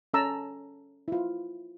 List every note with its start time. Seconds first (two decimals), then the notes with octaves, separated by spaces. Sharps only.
0.14 C#4 A4 A5 A#5 E6
1.08 E4 F4